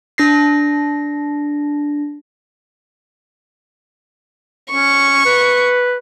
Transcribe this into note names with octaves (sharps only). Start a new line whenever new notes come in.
D4 A#6 C7
C#4 C#6
B4